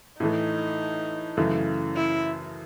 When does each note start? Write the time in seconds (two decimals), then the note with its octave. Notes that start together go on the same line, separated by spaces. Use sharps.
0.20 A2 E3 A3 D#4
1.37 F#2 C#3 E3 A3
1.96 E4